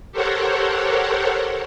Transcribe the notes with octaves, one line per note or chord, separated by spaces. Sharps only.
G4 A4 A#4 C5 C#5 F#5